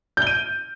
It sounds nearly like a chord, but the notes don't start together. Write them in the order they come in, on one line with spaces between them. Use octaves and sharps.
G6 G7 D#7